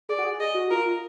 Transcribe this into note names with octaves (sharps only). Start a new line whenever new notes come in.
G#4 D5
F#4
G#4
G#4 D#5
F#4
F4 A#4